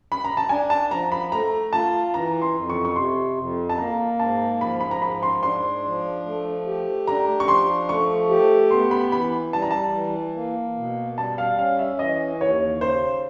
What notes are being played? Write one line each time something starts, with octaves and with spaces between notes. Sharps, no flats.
B5
A#5
A5
D4 G#5
A5
F3 A#5
B5
A3 A#5
F4 A5
E3 A#5
C6
F2
C#6
C#6
C3 C6
F2
A5
A#3 A#5
G#2 A5
F3 B5
B5
A#5
G#2 B5
C6
D4 C6
F3
A3
G4
D4 A#5
C#6
F3 C6
A3 C#6
G4
B3 C6
B5
E3 B5
G3 A5
A#5
A5
E3
A#3
B2
G3 A5
F5
C#4 F5
E5
E3 D#5
D#2 C#5
C#3 C5